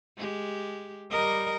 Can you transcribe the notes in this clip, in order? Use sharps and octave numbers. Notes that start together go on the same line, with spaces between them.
G#3 G4
G3 G4 A#4 D#5